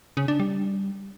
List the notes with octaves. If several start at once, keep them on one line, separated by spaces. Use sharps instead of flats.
C#3
D4
G3